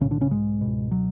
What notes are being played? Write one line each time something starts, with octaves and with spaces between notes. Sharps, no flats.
B1 A2 C#3 C#4
D3 D4
C#3 C#4
G#2 G#3
C#2 B2
F#3